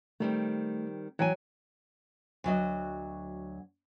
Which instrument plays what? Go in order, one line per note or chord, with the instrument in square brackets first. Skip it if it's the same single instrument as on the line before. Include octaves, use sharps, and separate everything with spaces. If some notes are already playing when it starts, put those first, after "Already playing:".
[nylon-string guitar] D#3 G3 C4 [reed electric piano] A3
[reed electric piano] E3 [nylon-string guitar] F#3 G5 G#5
[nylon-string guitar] D2 F#3 D#5